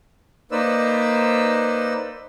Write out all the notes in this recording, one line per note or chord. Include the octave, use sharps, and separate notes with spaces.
A#3 D#4 B4 C5 D5 E6